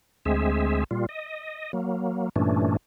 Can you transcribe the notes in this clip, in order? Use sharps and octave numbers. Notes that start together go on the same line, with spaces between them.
D2 G#3 C4 G#4 E5
A#2 G3 F4
D#5
F#3 A#3
G2 A#2 E3 A3 C#4 D4